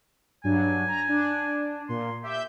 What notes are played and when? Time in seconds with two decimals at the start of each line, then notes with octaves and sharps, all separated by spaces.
0.44 G2 F#3 D4 G#5
0.88 A#5
1.08 D4
1.89 A#2 C6
2.24 G4 E5 G6